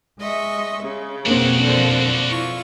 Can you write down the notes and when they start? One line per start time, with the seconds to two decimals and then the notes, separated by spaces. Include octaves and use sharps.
0.20 G#3 D#5 E5 C#6
0.84 C#3
1.26 F2 B2 A#3 C4 D4 F#4
1.62 D3 F3
2.29 E4 F4 C#6